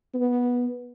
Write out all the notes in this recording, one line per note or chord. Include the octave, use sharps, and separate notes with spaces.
B3